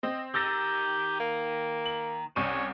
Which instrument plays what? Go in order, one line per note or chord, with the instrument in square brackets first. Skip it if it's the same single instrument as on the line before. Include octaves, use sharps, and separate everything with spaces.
[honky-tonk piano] C4 [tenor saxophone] D#5
[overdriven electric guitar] D#3 [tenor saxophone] G4 [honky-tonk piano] E6 A6 A#6
[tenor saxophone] A#3
[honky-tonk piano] F#7
[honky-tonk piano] C2 C#6 D#7 [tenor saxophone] C#4 [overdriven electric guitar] C5 C#5